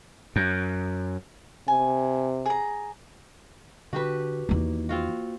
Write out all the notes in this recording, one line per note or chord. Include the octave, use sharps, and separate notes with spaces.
F#2
C3 G#5
G#4 A#5
D3 F#4 G4 B4
E2 D#3 A#3
C4 F4 F#4